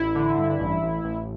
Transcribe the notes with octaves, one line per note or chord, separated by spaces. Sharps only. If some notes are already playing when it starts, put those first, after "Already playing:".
Already playing: A1 E4
D3
G2
A1
A1
A1